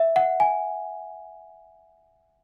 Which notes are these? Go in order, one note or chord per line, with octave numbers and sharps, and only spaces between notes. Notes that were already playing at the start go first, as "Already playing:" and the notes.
Already playing: E5
F#5
G#5